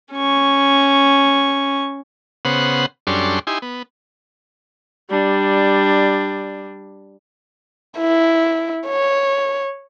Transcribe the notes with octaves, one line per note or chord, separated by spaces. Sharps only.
C#4 C#6
C#3 B3 C5 F#5
F#2 G3 C#4 D4 A4 C6
D#4 E4 G4 G#5 C6
B3
G3 D4
E4
C#5